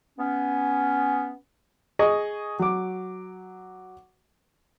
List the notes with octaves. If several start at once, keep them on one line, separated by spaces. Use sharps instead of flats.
B3 C#4
G#4 D#5 C#6 D#6
F#3 D6